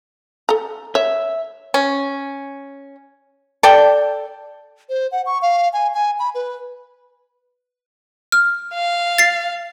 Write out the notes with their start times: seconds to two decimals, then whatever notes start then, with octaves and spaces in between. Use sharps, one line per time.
0.49 A4 A#5
0.95 C#5 E5
1.74 C#4
3.63 A4 D5 G5
4.89 C5
5.12 F#5
5.26 C#6
5.42 F5
5.73 G#5
5.94 G#5
6.19 B5
6.35 B4
8.32 F6
8.74 F5
9.18 A6 C7